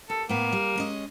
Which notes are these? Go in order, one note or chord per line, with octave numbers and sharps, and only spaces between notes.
D#2 A4
A2 A#3 B3
G3
G#3 C#4 D#5